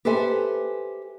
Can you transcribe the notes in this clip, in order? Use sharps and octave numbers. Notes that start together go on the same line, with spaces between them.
G4 A4 B4 C5 E5 G#5